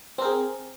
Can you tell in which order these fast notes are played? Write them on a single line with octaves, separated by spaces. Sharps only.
C4 A#4 G#4